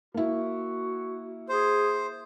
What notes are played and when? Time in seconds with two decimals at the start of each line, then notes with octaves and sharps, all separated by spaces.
0.14 A#3 E4 F#4
1.49 G#4 C5